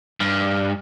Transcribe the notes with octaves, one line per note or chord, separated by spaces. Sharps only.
G2